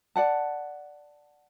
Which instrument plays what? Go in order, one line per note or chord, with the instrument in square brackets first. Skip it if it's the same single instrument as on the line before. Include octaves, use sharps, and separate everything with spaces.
[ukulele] D5 F#5 A5